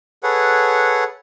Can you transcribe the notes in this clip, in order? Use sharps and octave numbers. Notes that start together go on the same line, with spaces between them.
G#4 A4 B4 C#5 F#5